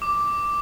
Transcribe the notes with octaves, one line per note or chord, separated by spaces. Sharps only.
D6